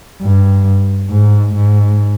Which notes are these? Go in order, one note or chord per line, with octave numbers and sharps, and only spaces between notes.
G2
G#2
G#2